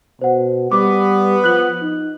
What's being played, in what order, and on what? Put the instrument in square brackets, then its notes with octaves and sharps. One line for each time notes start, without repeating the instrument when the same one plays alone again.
[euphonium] B2 [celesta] C5 F#5
[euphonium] G3 [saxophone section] B3 [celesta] D6
[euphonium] F3 [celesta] F#6 F#7
[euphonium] D#4